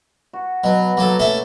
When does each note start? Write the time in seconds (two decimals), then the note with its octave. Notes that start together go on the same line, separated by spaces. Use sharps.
0.33 F#4
0.64 B2 F#3
0.97 F#3 A#3 A4
1.19 A3 C#4 A4